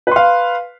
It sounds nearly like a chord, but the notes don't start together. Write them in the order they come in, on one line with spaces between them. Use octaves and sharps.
B4 C6 F5